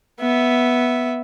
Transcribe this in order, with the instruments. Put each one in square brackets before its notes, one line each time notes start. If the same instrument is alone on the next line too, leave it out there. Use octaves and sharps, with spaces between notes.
[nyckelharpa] B3 E5